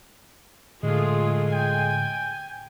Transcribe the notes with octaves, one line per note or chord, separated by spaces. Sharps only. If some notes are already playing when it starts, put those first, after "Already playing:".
A2 D3 G#3 A3 F4 G#4
G5 G#5